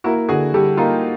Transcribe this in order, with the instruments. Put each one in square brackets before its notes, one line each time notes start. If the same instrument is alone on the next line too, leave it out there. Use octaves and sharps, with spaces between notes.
[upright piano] A#3 [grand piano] E4 F#4
[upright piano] D3 [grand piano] F#4 G#4
[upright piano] G3 [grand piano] G4 A4
[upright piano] A#3 [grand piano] D#4 F4